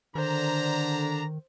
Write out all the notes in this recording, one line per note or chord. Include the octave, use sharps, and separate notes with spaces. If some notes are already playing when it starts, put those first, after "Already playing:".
D3 D#3 D4 C5 A#5